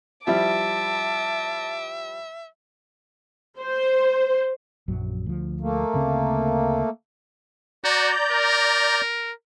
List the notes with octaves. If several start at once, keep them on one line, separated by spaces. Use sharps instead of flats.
F3 G3 E4 E5 A5 D6
C5
A#1 F#2 F#3
D2 F3
A3 A#3
D2 C#3 C4
F#4 D5 A#5 G6
A#4